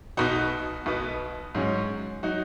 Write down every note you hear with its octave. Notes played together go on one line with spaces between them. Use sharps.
B1 B2 B3 D#4 F#4
B1 B2 B3
G#2 F#3 C#4
F#3 D#4 F#4